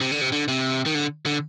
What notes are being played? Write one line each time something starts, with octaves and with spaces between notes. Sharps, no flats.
C3
D3
C3
D3
C3
D#3
D3
D3